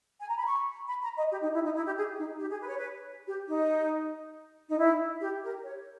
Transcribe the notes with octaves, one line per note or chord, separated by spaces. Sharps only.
G#5
A#5
B5
C#6
B5
A#5
D#5
G4
D#4
E4
D#4
E4
G4
G#4
D#4
G4
G#4
B4
C#5
B4
G4
D#4
D#4
E4
G4
A#4
C#5